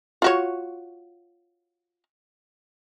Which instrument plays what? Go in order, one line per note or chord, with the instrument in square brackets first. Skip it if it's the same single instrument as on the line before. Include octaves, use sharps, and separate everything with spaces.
[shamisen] F4 F#4 C#5